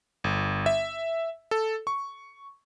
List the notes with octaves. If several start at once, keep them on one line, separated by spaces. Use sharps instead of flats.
G1
E5
A4
C#6